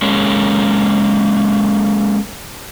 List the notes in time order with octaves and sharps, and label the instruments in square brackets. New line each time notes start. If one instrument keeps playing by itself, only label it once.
[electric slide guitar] G#3 A#3 C#4